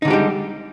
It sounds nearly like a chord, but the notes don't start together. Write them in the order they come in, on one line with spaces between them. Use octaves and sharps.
D#4 D3 G#3 G4 G3